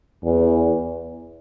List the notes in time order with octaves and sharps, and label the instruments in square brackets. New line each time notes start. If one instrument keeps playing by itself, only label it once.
[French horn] E2